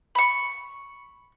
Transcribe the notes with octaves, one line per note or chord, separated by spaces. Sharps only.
B5 C#6